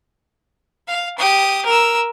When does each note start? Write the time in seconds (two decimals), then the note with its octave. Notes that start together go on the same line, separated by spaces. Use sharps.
0.88 F5
1.18 G4 D#6
1.65 A#4 E6